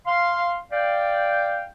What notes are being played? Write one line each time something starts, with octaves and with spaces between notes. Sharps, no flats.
F5 C6
D5 F5 G5